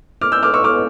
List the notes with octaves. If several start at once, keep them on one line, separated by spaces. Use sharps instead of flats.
D6 F6
E6 G6
D6 F6
C#6 E6
D6 F6